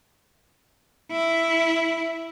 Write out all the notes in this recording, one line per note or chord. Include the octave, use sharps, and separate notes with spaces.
E4